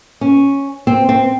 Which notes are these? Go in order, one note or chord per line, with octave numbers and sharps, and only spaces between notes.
C#4
C4
C4